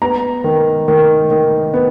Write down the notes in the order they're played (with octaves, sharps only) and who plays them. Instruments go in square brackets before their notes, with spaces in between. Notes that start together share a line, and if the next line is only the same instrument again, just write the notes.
[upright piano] B3 A#5
D#3
D#3
D#3
B3